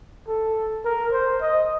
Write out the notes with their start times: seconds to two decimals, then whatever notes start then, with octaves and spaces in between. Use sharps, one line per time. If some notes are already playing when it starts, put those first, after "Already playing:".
0.28 A4
0.85 A#4
1.12 C5
1.41 D#5